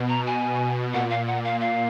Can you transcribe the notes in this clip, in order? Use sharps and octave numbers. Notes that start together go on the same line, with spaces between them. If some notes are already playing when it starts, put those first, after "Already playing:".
Already playing: B2
A#5
G#5
A#2 F#5
F5
F#5
F5
F5